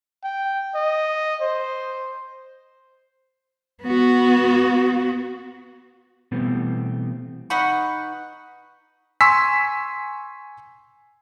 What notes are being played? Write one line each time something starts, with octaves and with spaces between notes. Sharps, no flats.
G5
D#5
C5
B3 F#4
B2 E3 G3 A3 B3 C4
D#4 B4 F#5 C#6
G#5 C6 C#6 E6 B6